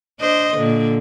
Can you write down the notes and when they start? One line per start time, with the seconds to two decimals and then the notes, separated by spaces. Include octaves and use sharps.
0.20 D4 C5 D#5
0.55 A#2 D3